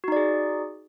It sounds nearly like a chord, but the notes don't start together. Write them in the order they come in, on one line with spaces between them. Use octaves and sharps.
F#4 D#4 D5 G#4